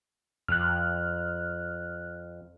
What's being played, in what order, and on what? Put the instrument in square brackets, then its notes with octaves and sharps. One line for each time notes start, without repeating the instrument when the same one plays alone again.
[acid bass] F2 [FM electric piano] F6 F#6